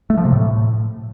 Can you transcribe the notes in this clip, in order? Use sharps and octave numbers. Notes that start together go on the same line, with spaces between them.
A3
F3
C3
A2